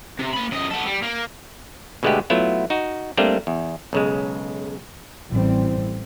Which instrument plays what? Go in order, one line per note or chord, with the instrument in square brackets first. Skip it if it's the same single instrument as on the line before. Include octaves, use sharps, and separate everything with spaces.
[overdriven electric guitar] C3
A#3 B5
F#2 D#5
B3 A4
G3
A#3
[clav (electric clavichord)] B2 D3 G#3 A3 B3 G4
F#3 A3 B3 E4 F4
D#4 F#4
G3 A3 A#3 C4 D4
E2
B1 C#3 G#3
[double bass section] A1 E3 G3 C4